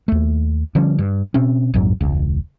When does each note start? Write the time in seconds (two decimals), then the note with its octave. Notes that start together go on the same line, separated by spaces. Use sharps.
0.08 D#2 A3
0.75 D3 F3 G3 C#4
0.99 G2
1.34 B2 C4 C#4
1.74 A#1 F2 G#2 F#3
2.01 E1 C#2